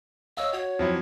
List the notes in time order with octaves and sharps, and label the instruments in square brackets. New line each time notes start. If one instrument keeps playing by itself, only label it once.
[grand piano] C#5 D#5 F5 [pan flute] E6
[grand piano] F#4 [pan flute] C#5
[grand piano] F2 [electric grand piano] F3 F#3 E4